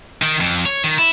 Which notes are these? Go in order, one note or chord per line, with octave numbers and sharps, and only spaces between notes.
D#3
F2
C#5
D#3
E4